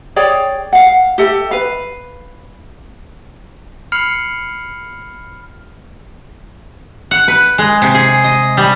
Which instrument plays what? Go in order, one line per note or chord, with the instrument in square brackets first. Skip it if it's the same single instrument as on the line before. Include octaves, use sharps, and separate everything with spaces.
[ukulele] G#4 C#5 D5 G5
F5 F#5
G4 A4 E5
B4 F5
[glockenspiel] B5 F6 C7 C#7 F7 F#7
[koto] F#5
B4
G#3
C3
G#4
D#5
G3